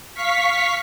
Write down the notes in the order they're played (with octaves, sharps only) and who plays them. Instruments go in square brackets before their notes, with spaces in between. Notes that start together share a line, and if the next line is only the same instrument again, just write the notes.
[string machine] F5 C#6 B6